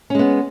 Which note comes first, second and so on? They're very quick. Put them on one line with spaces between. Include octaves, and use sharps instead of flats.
C#4 G#3 B3